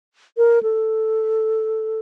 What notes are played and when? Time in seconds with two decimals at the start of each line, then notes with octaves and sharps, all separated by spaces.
0.37 A#4
0.63 A4